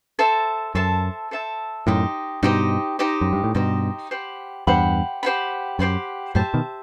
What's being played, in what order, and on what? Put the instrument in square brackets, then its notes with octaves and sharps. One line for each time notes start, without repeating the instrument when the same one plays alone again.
[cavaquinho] A4 C5 E5 A5
[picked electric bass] F#2 [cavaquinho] A4 C5 E5 A5
[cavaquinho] A4 C5 E5 A5
[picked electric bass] F#2 A2 [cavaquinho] D#4 G4 C5 D#5
[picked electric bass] G2 B2 [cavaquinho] D#4 G4 C5 D#5
[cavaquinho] D#4 G4 C5 D#5
[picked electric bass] F#2
G2
A2
[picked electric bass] G2 B2 [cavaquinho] D#4 G4 C5 D#5
[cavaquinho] G4 C5 F#5 B5
[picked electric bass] E2 G2 [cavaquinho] G4 C5 F#5 B5
[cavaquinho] G4 C5 F#5 B5
[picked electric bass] F#2 [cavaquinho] G4 C5 F#5 B5
[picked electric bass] F#2 A2 [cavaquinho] G4 C5 E5 A5
[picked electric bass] B2 D#3